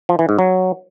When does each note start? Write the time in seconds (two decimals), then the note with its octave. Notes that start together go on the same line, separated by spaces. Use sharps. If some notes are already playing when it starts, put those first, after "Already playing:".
0.09 F3
0.19 E3
0.29 G#2
0.39 F#3